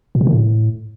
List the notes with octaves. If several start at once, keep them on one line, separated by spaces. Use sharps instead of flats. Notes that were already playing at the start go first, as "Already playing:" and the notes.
A#2
C3
D#3
A2